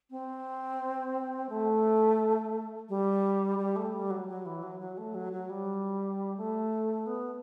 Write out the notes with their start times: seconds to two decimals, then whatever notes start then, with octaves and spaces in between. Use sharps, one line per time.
0.11 C4
1.49 A3
2.89 G3
3.59 G3
3.76 A3
3.93 G3
4.11 F#3
4.28 F#3
4.46 E3
4.63 F#3
4.80 F#3
4.98 A3
5.15 F#3
5.33 F#3
5.50 G3
6.37 A3
7.06 B3